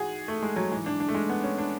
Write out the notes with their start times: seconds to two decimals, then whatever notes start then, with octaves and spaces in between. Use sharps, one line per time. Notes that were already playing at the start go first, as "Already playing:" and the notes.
Already playing: G#2 E3 F#4 G#4
0.28 A3
0.42 G#3
0.56 F#3
0.72 G#2 E3 G#3
0.86 D4
1.00 D4
1.08 A3
1.14 G#3
1.29 B3
1.43 C#4
1.58 D4